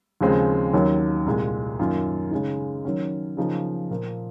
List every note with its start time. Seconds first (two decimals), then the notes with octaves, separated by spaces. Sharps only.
0.21 D#2 C#3 F3 G#3 C4
0.74 D#2 D#3 F#3 C#4
1.26 C2 A#2 G#3
1.79 F#2 D#3 A#3 F4
2.31 C#3 G#3 D#4
2.85 D#3 F#3 C#4
3.37 C#3 F3 A#3 D#4
3.90 A#2 F3 A#3